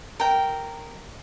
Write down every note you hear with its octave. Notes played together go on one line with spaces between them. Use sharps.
A#4 G5